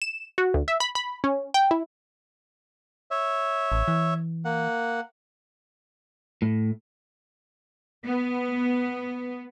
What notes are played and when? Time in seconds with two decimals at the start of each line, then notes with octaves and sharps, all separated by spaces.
0.02 E7
0.38 F#4
0.54 D2
0.68 E5
0.80 B5
0.95 B5
1.24 C#4
1.54 G5
1.71 E4
3.11 C#5 E5
3.72 A1
3.88 E3
4.45 A#3 F#5
6.42 A2
8.05 B3